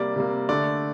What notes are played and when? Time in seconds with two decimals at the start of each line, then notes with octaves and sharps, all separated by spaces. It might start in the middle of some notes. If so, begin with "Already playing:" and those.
Already playing: C3 G3 A#3 D5
0.16 C3 G3 A#3
0.49 D3 A3 D5